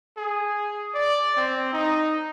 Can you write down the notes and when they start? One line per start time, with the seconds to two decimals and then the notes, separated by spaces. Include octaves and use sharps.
0.17 G#4
0.94 D5
1.37 C4
1.73 D#4